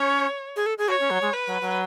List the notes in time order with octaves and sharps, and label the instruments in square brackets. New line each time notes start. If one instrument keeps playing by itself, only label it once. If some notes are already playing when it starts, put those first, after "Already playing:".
Already playing: [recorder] C#4 [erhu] C#5
[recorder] G#4
A4
G#4
[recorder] F#4 [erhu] C#5
[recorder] C#4
F#3
G#3
[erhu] B4
[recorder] F#3
F#3